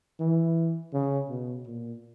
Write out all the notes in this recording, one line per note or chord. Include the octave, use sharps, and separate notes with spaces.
E3
C#3
B2
A#2